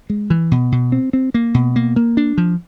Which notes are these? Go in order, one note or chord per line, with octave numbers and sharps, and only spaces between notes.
G#3
E3
B2
B2
C4
C4
A#3
B2
A#3
A#3
D4
F3